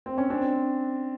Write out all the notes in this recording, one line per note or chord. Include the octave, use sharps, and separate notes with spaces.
C4
C#4
C4 D4